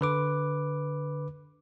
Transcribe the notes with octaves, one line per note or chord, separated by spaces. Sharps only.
D3 B4 D6